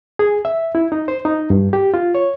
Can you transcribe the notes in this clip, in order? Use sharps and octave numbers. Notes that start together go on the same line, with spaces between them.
G#4
E5
E4
D#4
C5
D#4
G2
G4
F4
C#5